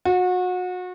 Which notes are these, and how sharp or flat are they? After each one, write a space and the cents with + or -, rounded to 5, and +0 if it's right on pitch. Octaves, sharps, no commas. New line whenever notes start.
F#4 -30